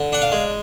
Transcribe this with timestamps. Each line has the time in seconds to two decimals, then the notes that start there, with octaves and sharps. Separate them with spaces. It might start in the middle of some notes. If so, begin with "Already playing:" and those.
Already playing: D3
0.12 D4 F#5
0.22 F5
0.32 G#3